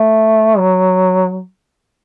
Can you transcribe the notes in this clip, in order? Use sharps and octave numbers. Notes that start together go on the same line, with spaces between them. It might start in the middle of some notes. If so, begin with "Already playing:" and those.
Already playing: A3
F#3